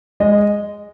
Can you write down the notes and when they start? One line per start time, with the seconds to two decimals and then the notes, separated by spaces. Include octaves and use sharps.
0.20 G#3 D#5